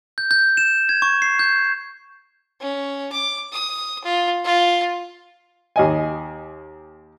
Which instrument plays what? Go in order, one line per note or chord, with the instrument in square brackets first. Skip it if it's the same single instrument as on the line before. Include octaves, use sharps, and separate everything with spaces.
[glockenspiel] G6
G6
E7
G#6
C#6
C7
G6
[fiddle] C#4
D6
D#6
F4
F4
[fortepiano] D#2 D#5 G#5